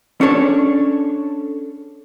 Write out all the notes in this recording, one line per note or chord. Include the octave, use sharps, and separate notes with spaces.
C#4 D4 A4 C#5